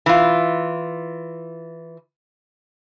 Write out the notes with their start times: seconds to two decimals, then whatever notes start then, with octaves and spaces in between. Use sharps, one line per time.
0.06 E3 F4